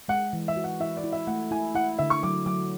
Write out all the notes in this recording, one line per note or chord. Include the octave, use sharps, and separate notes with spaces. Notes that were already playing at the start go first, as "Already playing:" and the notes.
G#3 F#5
E3
E5
F#4
F#5
E4 E5
D5
E4
E5
A3 F#5
E4 G#5
E4 F#5
D3 E5
C#6
F#3 D6
F#3 D6